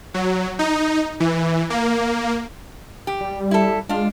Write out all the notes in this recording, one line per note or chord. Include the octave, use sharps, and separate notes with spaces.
F#3
D#4
E3
A#3
G4
G3
E4 A4
G#3 D4 F4